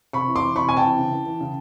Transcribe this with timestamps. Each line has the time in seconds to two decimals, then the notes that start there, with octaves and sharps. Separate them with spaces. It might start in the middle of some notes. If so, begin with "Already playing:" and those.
0.13 C3 B5 C#6
0.27 E3
0.36 C6 D6
0.43 E3
0.56 C3 B5 C#6
0.69 C3 G#5
0.77 G5 A5
0.84 E3
0.99 C#3
1.13 E3
1.26 E3
1.41 C#3